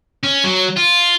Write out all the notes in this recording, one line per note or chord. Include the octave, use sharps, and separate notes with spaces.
C#4
F#3
F4